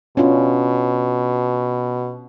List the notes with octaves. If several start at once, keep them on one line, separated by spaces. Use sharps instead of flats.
B2 C#4 D4 F4